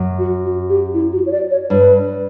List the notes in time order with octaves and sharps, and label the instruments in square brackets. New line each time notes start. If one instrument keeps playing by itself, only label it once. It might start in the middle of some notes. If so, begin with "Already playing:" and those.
Already playing: [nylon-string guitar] F#2
[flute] F#4
F#4
G4
E4
F#4
C#5
D5
C#5
[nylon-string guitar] G2 [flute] B4